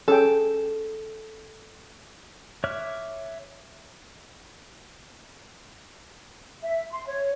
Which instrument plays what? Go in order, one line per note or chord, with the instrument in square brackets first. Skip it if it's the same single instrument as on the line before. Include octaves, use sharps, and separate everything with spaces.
[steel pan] C#4 G#4 G5 [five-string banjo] A4
[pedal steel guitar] C#5 E5 D6 F6 F#6
[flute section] E5
C6
C#5